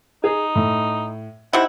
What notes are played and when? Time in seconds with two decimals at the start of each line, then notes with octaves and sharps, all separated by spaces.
0.24 D#4 G#4
0.55 A2
1.53 C3 D#4 E4 F#5